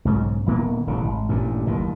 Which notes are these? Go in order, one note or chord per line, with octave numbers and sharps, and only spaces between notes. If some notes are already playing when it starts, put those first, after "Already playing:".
B1 G#2 C#3
D#1 D#3 A#3 B3
D#1 A1 C#3
G#1
A1 G2 A#2
F#1 D#2 A2 D#3